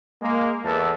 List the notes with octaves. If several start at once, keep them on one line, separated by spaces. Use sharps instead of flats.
G#3 A#3
E2 A4